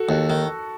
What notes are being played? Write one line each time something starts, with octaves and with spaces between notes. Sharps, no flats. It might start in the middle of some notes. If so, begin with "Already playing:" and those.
Already playing: F#4 A4
D#2
D#3